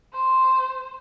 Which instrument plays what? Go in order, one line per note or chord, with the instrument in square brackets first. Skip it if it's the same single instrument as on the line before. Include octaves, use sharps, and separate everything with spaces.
[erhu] C5